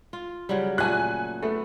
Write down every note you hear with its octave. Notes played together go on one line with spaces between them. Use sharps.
F4
C#3 F#3 G3
A#2 A3 G#5 F#6
A3 B3